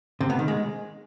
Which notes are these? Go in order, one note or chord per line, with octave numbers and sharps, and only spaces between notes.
C3
B3
D#3
G#3